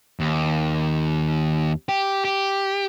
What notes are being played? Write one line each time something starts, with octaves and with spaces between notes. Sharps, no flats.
D#2
G4
G4